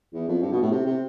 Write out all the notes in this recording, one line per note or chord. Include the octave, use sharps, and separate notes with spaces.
E2
F2
G2
B2
A2
C3
C3